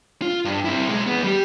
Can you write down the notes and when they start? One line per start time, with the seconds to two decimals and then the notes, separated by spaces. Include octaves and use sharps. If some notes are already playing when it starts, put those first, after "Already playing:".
0.22 F4
0.45 G2
0.65 C4 E4
0.88 B1 G#3
1.07 E2 B3
1.24 G3 G4